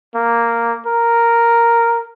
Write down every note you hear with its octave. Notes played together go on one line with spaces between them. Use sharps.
A#3
A#4